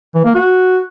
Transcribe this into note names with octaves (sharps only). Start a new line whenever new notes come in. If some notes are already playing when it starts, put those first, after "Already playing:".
E3
A#3
F#4